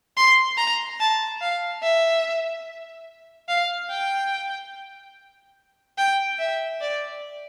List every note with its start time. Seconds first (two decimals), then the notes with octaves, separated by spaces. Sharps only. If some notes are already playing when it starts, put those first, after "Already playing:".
0.17 C6
0.58 A#5
1.00 A5
1.41 F5
1.83 E5
3.48 F5
3.90 G5
5.98 G5
6.39 E5
6.81 D5